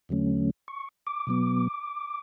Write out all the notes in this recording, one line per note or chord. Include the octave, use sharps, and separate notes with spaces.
E2 D3 F#3 A3 C#4
C#6
D6
B2 F#3 B3